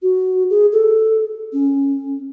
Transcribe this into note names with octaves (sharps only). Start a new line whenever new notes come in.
F#4
G#4
A4
C#4